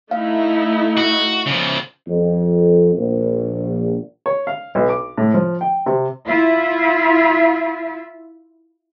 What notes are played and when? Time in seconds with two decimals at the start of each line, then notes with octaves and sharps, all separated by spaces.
0.11 A3 D#4 E4 F5
0.97 F#4
1.46 C#3 F3
2.08 F2
2.95 A#1
4.26 C#5
4.47 F5
4.75 B1
4.89 D6
5.18 A2
5.34 F3
5.61 G5
5.86 C3
6.26 E4 F4 E5